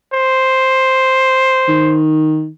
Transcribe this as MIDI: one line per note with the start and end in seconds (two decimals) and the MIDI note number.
0.13 2.00 72
1.68 2.49 51